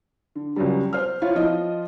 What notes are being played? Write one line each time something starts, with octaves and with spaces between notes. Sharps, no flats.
D3
C#2 F#3 G3
C5 F6
E4 F4 C#5 F5
F3 F4 D#5